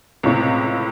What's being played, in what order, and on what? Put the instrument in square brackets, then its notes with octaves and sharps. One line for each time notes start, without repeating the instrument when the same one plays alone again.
[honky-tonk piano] C#2 A2 C3